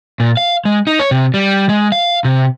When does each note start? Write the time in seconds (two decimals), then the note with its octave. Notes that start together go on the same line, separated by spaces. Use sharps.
0.20 A#2
0.37 F5
0.65 G#3
0.87 D#4
0.99 C#5
1.11 C3
1.34 G3
1.69 G#3
1.92 F5
2.24 C3